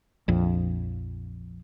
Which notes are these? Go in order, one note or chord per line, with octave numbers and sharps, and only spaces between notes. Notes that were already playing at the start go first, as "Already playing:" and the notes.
A#1 F2